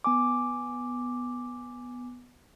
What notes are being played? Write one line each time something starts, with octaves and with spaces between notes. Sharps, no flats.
B3 G#5 D6